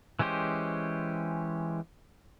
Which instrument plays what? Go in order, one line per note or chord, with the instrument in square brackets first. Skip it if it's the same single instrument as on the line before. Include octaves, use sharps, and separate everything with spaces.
[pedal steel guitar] E3 G#3 C#4 G4 C5